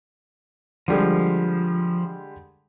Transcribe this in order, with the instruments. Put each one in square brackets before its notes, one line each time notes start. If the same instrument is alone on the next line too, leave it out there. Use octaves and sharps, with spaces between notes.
[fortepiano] D3 G3 G#3 [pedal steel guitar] F3